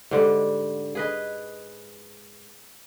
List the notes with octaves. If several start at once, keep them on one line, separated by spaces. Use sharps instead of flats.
G#2 D3 G3
G#4 B4 D#5